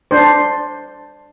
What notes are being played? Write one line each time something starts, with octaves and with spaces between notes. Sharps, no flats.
D4 C5